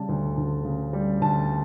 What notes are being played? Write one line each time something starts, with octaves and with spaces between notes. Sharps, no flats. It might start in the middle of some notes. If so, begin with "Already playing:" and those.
Already playing: C#3 G3 A5
D2
D2
C#3
G3
D2 A5